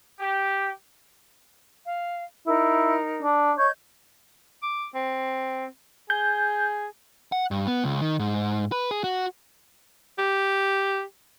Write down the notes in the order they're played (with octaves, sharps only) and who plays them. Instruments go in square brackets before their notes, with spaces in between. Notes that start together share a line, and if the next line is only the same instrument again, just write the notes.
[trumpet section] G4
[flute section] F5
[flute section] D#4 A#4 [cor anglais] E4
[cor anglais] D4
[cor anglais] C#5 [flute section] D#5 G6 G#6
[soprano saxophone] D6
C4
[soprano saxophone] G#4 [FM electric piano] G6
[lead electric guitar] F#5
G2
B3
C#2
D#3
G#2
B4
G#4
F#4
[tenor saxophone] G4